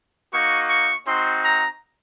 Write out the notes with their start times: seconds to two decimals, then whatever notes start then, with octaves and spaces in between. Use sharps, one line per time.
0.33 A#3 D#4 F#4 C#6
0.69 C#6
1.06 C4 D#4 F#4 C6
1.43 A#5